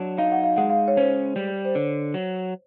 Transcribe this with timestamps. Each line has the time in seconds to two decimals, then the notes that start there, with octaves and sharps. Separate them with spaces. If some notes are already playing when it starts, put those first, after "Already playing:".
Already playing: F#3 D4
0.18 D#4 F5
0.32 F#5
0.43 F5
0.56 G#3 F#5
0.70 F5
0.88 C#5
0.97 C#4 C5
1.36 G3
1.65 C5
1.75 D3 C#5
2.14 F#3